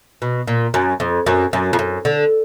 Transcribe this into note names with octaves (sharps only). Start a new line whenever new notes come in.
B2
A#2
F#2
F2
F#2
F#2
F2
F#2
D3